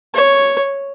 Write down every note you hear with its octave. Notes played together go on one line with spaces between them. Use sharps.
C#5